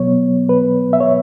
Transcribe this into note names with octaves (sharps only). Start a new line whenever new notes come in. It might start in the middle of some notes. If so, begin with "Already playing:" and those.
Already playing: B2 F#3 B3 C#5
B4
E5
C#5